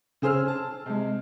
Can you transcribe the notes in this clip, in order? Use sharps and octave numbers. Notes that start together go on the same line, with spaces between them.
C#3 G#4 C5 E6 F6
A5
C3 G#3